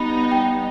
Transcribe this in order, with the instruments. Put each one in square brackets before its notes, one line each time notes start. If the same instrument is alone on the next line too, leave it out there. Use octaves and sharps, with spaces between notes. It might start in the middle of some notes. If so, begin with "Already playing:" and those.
Already playing: [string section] G3 B3 D#4 [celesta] B5
[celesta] G5